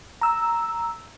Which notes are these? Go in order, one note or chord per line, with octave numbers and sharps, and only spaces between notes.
A#5 E6